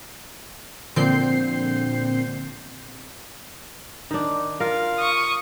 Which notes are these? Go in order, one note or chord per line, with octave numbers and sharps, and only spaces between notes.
A#2 D3 F3 C4 G6 C7
D#3 D4
F4 A#4 F5
C#6 D#6